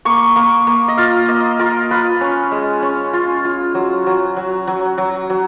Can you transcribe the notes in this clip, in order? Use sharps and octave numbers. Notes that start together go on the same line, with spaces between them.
A#3 C#6
A#3
A#3
D#5
F4 F5
A#3 D#5
F4 A#4
F4 B4
C#4
G#3
C#4
F4
F4
F#3
F#3
F#3
F#3
F#3
F#3